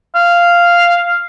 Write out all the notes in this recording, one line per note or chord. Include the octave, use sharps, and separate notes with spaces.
F5